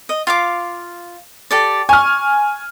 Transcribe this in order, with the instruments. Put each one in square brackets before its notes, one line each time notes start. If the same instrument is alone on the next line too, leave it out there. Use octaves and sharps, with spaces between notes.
[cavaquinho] D#5
F4 F5 D6
G4 A4 D5
[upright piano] G#5 F6 [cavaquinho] C#6